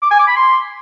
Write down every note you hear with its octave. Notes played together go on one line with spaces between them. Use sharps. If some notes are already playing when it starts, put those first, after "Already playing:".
D6
G#5
D6
B5
C6